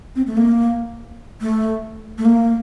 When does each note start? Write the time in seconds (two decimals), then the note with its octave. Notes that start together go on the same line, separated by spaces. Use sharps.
0.16 C4
0.27 A3
0.37 A#3
1.41 A3
2.18 A3
2.25 A#3